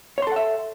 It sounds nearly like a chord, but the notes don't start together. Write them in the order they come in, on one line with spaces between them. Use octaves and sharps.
C#5 C6 A4 F#5 E5